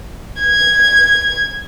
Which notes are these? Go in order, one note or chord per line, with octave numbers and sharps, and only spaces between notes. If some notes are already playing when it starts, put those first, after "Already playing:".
G#6